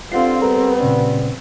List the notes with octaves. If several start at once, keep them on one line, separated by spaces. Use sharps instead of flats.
G2 C4 F4 A4 F#5 C7
G3 B3 A4 A#4 A#5
A#2 C#3 C#4